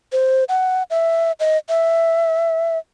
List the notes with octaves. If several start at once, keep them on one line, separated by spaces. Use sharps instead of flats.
C5
F#5
E5
D#5
E5